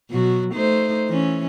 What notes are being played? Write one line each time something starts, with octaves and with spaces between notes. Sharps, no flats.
B2 F#3 F#4
A3 D#4 C5
E3 C#4